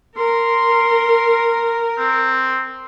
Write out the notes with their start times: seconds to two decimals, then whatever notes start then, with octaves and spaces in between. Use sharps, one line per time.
0.18 A#4 C6
1.98 C4